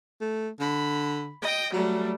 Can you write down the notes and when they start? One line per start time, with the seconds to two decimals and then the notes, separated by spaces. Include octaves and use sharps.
0.21 A3
0.60 D3 B5
1.42 D#5 G5
1.73 F#3 G3 A3